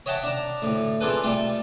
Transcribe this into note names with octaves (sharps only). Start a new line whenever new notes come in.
C#5 D#5 E5 F#5 G5 A5
D4 A#5
D2 A2
C4 D4 F4 G#4 A4 B4
G3 A3 F4 G4 A4